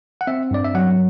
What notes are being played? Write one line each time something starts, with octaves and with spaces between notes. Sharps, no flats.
F#5
C4 E5
G2 D5
E5
F#3 F#5